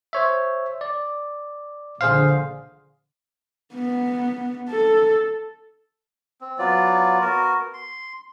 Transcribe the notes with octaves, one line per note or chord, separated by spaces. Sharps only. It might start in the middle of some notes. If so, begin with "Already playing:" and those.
C5 C#5 E5
D5
A#1 D3 G#4 C5 F5
B3
A4
C4
F#3 B3 F4 D5
B3 F#4 A#4
C6